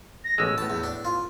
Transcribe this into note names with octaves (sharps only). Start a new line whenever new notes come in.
A#6
A1 B2 G#3 E6
A2 B3 A5
E2
D4
F4